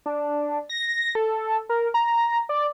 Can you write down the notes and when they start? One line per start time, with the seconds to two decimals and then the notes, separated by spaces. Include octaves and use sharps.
0.06 D4
0.69 A#6
1.15 A4
1.69 A#4
1.94 A#5
2.49 D5